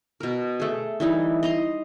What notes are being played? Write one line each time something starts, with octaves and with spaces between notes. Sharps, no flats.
B2 A#4
A3 G#4
E3 G3 D#4 E4
D#5 A#5 C6